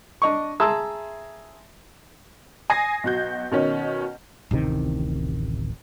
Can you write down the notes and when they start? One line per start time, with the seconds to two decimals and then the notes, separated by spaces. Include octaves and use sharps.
0.22 D4 D#5 C#6
0.60 G#4 E5 A5 A#5 C6 E6
2.70 G#5 D#6 G#6 A#6 C7
3.04 B1 F#4 G6
3.51 B2 D#3 C#4
4.51 D1 A1 C3 D#3